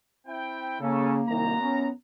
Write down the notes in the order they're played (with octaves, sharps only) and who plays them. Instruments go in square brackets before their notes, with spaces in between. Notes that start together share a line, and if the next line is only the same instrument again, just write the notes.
[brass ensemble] C4 E4 G5
[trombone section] C#3 [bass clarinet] A#3 [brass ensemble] C#4 A4
[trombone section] C2 D#3 [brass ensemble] F#2 A#5
[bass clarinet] B3 [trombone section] C#4